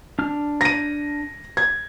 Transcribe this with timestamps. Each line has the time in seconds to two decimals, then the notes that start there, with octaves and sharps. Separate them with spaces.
0.19 D4 F6
0.61 A#6 D#7
1.57 G#6